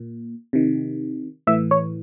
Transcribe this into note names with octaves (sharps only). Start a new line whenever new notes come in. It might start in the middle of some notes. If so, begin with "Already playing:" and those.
Already playing: A#2
C3 D#3
A2 E3 E5
C#5